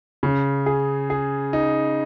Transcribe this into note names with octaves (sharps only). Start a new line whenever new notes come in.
C#3
G#4
G#4
D#4